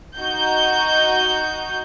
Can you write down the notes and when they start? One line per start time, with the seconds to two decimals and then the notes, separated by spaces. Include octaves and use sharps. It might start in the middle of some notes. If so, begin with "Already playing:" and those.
0.18 D#4 F#4 G6